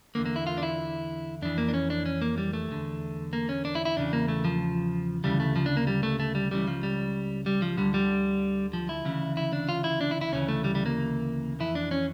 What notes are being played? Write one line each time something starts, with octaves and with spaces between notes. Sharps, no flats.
E2 D3 A#3
A#3
E4
F4
D4
E4
F2 E3 D4
A#3
D4
C#4
D4
C#4
A#3
G3
A3
E2 D3
A#3
C#4
D4
E4
E4
E2 C#3 E3 D4
A#3
A3
F3
D2 C#3 E3 G3
A3
F3
D4
A#3
G3
A3
A3
G3
C#2 C#3 E3 G3
F3
G3
G3
F3
D2 D3 G3
G3
F3
E4
D2 C#3 E3
E4
D4
F4
E4
D4
E4
E4
D2 C#3 E3 C#4
A3
G3
G3
A#3
F2 E3 E4
D4
C#4